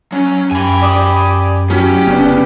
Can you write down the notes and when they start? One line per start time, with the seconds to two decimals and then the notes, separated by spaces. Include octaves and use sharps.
0.12 F#3 C#4
0.51 F#2 G4 G#5 B5
0.82 D5 D6 D#6
1.70 F#3 C#4 G4
2.07 F1 C#3 B3 D4